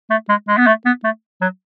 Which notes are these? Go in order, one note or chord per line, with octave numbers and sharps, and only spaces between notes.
A3
G#3
G#3
B3
A3
B3
A3
F#3